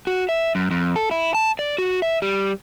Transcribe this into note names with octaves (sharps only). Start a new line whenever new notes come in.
F#4
E5
F#2
F2
A4
E4
A5
D5
F#4
E5
G3